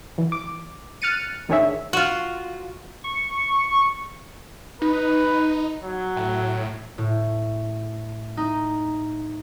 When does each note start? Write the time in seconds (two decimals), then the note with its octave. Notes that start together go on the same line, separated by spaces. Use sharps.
0.18 E3
0.32 D6
1.02 F6 F#6 A6 C#7 D#7
1.49 A1 D#3 D4 G#4 C#5 E5
1.93 F4 F#4
3.04 C#6
4.82 D#4 B4
5.83 F#3
6.16 A2
6.98 A2
8.37 D#4